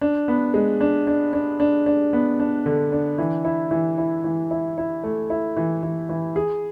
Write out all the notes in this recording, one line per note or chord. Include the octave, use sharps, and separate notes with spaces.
D4
B3
G#3
D4
D4
D4
D4
D4
B3
D4
D3
D4
E3
E4
E3
E4
E3
E4
E4
A3
E4
E3
E3
E3
G#4